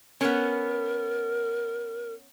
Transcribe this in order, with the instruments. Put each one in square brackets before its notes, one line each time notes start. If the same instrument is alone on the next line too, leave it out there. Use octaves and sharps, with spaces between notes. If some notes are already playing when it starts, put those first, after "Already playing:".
[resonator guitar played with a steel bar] B3 C#4 [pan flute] A#4